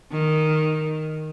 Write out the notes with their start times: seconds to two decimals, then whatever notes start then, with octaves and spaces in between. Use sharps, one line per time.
0.11 D#3